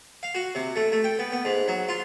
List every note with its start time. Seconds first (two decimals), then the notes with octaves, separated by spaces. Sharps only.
0.23 F5
0.35 F#4
0.55 C3
0.76 A3
0.92 A3
1.04 G5
1.19 B3
1.32 B3
1.45 G#2
1.68 F#3
1.89 F4